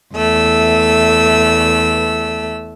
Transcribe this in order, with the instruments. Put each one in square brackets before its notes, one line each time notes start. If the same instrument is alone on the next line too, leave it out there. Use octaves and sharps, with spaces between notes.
[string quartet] E2 A3 E6